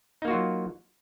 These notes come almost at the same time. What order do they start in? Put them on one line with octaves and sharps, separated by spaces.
D#4 A#3 F#4 F4 F#3